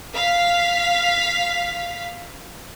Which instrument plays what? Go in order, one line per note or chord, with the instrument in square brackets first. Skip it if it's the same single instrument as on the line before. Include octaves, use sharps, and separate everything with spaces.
[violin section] F5 B6